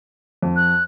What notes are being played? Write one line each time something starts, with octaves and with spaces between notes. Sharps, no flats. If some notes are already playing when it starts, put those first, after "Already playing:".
F2
F#6